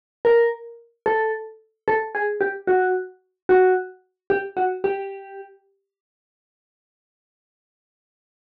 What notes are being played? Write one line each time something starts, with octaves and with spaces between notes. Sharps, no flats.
A#4
A4
A4
G#4
G4
F#4
F#4
G4
F#4
G4